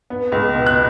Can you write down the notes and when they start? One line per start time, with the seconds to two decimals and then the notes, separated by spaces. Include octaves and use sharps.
0.10 B3
0.32 C#2
0.55 B2
0.67 F#6